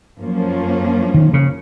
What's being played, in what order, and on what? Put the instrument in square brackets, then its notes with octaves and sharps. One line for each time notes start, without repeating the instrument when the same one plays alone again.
[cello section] F#2 F3 A#3 C#4
[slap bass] D#3
C#3